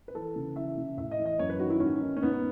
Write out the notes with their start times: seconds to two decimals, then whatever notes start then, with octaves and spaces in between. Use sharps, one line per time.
0.08 B4
0.15 E3 A4
0.35 C#3
0.56 E3 E5
0.77 C#3
0.97 A2 E5
1.11 D#5
1.18 E3
1.26 D#5
1.39 F#2 C#5
1.50 B4
1.59 D#3 F#4
1.70 E4
1.80 G#2 C#4
2.01 D#3
2.17 C#4
2.22 G#2 B3